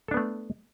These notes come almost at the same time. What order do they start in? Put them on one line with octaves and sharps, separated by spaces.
A4 D4 B3 A3